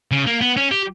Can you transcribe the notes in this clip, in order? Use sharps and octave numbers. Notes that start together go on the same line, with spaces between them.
C#3
A#3
B3
C#4
G4